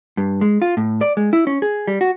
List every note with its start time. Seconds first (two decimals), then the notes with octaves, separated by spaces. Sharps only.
0.17 G2
0.41 G#3
0.62 F4
0.77 A2
1.01 D5
1.17 G#3
1.33 E4
1.47 C#4
1.62 G#4
1.88 G3
2.01 F#4